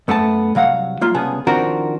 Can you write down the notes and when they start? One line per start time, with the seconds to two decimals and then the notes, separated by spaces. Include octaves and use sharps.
0.08 F#2 A3 B3 C#5 A5
0.55 C2 F#3 F5 F#5
1.01 F#3 A#3 F4
1.14 C2 C#3 B3 G#4 A5
1.47 D#3 F3 C4 D4 F#4 A#4